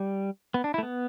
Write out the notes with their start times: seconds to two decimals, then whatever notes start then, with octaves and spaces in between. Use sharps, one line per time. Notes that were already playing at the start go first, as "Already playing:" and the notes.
Already playing: G3
0.54 B3
0.64 D4
0.74 E4
0.78 A3
0.83 B3